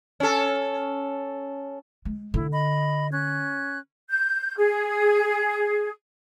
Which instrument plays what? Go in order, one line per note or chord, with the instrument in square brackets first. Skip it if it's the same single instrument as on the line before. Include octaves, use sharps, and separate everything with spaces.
[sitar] C#4 A4
[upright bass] G#3
[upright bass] D3 [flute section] E4
[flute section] D#5 B5
C#4 F#6 G#6
G6
G#4